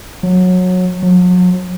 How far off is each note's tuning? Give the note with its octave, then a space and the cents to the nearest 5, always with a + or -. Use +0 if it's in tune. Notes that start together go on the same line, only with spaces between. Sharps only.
F#3 -20
F#3 -40